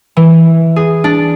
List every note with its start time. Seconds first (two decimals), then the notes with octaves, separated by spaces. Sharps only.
0.17 E3
0.76 G#4
1.04 D4